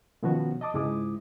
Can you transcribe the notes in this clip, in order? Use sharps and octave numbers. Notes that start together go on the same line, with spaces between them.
B2 D#3 F3 B3 C#4 F#4
D#5 A5 D6 D#6
C#2 G#2 G#3 E4 D6 D#6